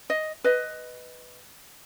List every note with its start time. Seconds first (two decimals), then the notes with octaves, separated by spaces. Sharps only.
0.10 D#5
0.44 B4 D#5